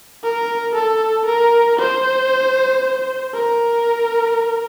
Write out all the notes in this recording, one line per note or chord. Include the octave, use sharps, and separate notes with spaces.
A#4
A4
A#4
C5
A#4